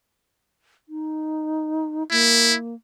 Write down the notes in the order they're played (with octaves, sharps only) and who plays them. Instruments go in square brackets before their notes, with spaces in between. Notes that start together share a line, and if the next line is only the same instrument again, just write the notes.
[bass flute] D#4
[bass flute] A#3 [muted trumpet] E4